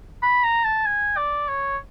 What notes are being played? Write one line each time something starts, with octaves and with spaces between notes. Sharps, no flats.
B5
A#5
A5
G#5
D5
C#5